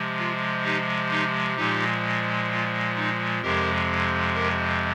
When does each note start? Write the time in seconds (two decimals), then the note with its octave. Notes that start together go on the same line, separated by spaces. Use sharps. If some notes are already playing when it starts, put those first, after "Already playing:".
Already playing: C3 F3 G#3
0.18 F4
0.64 D#4 G4
1.11 D#4 G4
1.57 A#2 F3 G#3 D#4 G4
2.50 F4
2.96 D#4
3.42 F2 C3 F3 G#3 G4 A#4
4.34 G4 A#4